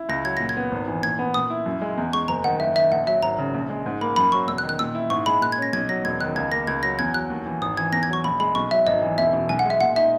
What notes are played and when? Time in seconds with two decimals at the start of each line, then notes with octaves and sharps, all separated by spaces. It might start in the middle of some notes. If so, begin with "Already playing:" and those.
Already playing: E4
0.09 C#2 A#6
0.24 F#3 G#6
0.37 A#2 A#6
0.49 G#6
0.57 B3
0.72 G#1
0.88 E3
1.03 A#2 G#6
1.19 B3
1.34 A#2 D#6
1.50 E4
1.66 F#2
1.82 G#3
1.98 E2
2.13 G#3 C#6
2.28 F#1 A#5
2.44 D#3 F#5
2.60 F#1 E5
2.75 D#3 E5
2.91 A#1 F#5
3.07 F#3 E5
3.22 G#1 A#5
3.39 C#3
3.54 A#1
3.70 G#3
3.86 G#2
4.01 A#3 B5
4.16 F#2 B5
4.32 F#3 C#6
4.48 E1 E6
4.58 F#6
4.63 D#3
4.69 F#6
4.79 A#2 E6
4.95 E4
5.10 G#2 C#6
5.26 G#3 B5
5.42 A#2 F#6
5.52 G#6
5.58 C#4 A#6
5.73 B1 G#6
5.89 F#3 A#6
6.04 E1 G#6
6.21 D#3 F#6
6.36 C#2 G#6
6.52 A#3 A#6
6.67 C#2 G#6
6.83 F#3 A#6
6.99 E2 G#6
7.14 F#3 F#6
7.30 D#2
7.46 E3
7.61 G#1 D#6
7.77 E3 G#6
7.92 E2 A#6
8.03 G#6
8.09 F#3 C#6
8.24 A#1 B5
8.39 G#3 B5
8.55 B1 C#6
8.71 F#3 E5
8.87 G#1 D#5
9.02 E3
9.18 E1 E5
9.33 B2
9.49 B1 G#5
9.59 F#5
9.65 G#3
9.70 E5
9.80 A#2 F#5
9.96 D#4 E5